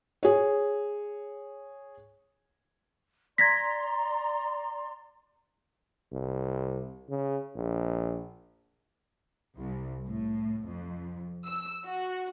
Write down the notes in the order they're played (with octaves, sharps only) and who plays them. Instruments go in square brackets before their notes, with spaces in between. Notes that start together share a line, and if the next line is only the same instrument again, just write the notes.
[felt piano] G#4 C#5
[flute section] D5 A#5 C6 [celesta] G#6 A#6 B6
[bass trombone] C2
C#3
A#1
[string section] C2
A2
F2
E6
F#4